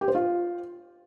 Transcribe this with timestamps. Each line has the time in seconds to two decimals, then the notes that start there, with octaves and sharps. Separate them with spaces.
0.01 G4
0.08 C5
0.15 F4